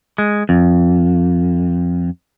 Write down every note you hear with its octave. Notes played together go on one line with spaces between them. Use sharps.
G#3
F2